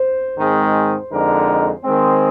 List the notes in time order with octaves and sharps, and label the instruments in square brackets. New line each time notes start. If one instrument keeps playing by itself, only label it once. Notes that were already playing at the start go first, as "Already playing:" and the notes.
Already playing: [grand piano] C5
[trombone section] G#2 D#3 G#3 C4
F2 D3 G#3 D#4 A#4
D#3 G#3 C4